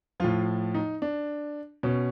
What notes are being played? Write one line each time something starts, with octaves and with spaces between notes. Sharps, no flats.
A2 F3 F4
D#4
D4
B2 C#4